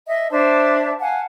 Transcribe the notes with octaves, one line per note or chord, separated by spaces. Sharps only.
D#5 E5
D4 C5 E5 A5
F5 F#5 G#5 A5